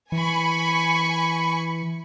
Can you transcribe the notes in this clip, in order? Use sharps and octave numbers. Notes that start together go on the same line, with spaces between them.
E3 G#5 B5 C#6